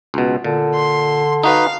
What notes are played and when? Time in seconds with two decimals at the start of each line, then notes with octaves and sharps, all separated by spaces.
0.14 C#2 B2
0.44 A#2 D3
0.74 C6
1.43 D#4 F#4 B4 F5